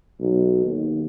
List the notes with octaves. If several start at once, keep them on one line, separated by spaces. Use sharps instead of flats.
B1
D#2